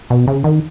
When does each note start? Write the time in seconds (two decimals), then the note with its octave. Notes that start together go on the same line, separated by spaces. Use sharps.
0.10 B2
0.27 C#3
0.44 D#3